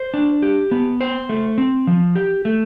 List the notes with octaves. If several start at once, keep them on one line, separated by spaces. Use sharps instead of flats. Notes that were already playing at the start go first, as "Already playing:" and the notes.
Already playing: C5
D4
G4
B3
C5
A3
C4
F3
G4
A3